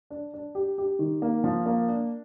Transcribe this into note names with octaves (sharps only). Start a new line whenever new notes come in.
D4
D4
G4
G4
D#3
A#3
F3
A#3
D4